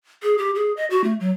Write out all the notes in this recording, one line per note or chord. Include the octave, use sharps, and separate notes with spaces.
G#4
G4
G#4
D#5
F#4
A3
F#3